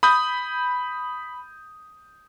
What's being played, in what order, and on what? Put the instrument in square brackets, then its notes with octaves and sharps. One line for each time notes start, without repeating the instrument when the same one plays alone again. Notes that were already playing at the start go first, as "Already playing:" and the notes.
[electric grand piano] B5 D#6 G6